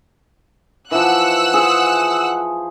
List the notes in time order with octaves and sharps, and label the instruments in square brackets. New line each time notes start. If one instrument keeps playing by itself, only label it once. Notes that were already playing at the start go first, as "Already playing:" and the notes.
[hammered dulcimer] E3 F3 [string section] F#5 E6 F#6
[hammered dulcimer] G#4 C5